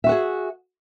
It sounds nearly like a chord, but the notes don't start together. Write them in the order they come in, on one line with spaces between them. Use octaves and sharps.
E5 F#4 F#5 G#4